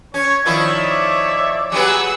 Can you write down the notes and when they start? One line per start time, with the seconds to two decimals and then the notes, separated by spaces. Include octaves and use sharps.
0.14 C#4 C#5 G#6
0.46 D#3 F3 E4 C#5 D5 E5
0.89 D6
1.72 F#3 G3 B3 G#4 F#5 E6